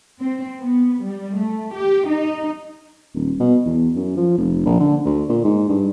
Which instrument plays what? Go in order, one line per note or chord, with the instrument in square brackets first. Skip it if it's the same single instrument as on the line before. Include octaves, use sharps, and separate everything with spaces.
[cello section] C4
B3
G3
A3
G4
D#4
[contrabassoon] D#1
B2
E2
F#2
F3
F1
A#1
D3
D2
A#2
G#2
G2